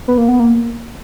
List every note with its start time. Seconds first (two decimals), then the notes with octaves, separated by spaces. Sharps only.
0.08 B3
0.18 A#3
0.28 B3
0.39 A#3